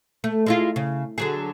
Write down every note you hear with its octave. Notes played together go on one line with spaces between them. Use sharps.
A3
G#3 E4 F4
C#3
D3 F#3 G#4